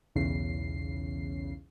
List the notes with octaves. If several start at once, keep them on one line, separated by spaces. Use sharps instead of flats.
B1 E2 C#3 C7